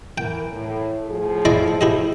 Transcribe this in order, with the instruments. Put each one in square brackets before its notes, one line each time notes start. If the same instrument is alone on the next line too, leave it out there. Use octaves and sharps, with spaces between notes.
[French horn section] E3 A#4 [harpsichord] G5
[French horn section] A2
A2 F3 G#4
[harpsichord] E4 D5 D#5
E4 G4 D#5